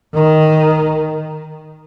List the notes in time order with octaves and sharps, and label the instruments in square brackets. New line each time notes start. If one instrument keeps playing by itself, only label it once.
[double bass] D#3